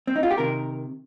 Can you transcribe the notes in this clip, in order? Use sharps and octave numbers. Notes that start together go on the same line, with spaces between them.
C4
D#4
F4
G4
C3 D#3 A#4